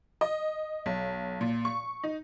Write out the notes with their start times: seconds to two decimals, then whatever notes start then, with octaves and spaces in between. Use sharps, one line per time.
0.21 D#5
0.86 B1
1.41 A#2
1.65 C#6
2.03 D#4